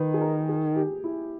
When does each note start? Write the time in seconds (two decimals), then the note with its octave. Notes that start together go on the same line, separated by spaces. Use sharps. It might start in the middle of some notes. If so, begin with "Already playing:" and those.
Already playing: D#3 B4
0.14 G#4
0.21 A#4
0.49 G#4
0.76 G4
1.04 E4